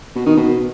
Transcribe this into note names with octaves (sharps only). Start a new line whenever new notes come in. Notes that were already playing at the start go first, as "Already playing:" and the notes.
B2
D#3
B2